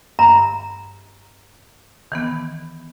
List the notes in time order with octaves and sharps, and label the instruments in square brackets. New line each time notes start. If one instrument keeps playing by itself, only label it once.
[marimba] G2 [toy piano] A#5
[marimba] D#3 E3 B3